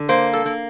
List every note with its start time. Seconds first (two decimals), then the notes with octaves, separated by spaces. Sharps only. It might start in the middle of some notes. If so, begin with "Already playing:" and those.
Already playing: D3
0.09 A#3 C5
0.34 A4
0.46 A#3